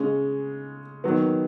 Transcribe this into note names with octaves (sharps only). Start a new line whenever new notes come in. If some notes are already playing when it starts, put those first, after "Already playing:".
Already playing: C#3 G#3 C#4
D#3 F#3 B3